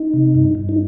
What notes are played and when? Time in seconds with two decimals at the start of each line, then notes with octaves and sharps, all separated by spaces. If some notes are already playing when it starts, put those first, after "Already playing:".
Already playing: D#4
0.14 C3
0.35 G2
0.55 G2
0.69 D#4